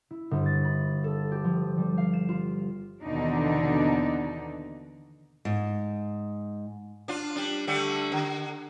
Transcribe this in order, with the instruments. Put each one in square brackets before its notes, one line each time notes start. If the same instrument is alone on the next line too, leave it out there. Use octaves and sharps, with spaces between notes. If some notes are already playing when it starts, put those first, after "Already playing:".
[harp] E4
G1
A6
B5
A4
G4
F3
G3
F5
E7
F4
[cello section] D#2 B2 D3 E3 D4 D#4
[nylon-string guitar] G#2
[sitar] D4 F4
G3 D4
D3 G3 A3
D3